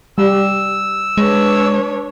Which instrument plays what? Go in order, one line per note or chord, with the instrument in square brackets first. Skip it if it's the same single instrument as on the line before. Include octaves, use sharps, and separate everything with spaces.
[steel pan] G3 [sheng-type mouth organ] E6
[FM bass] G#3 [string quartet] D4 B4 C#5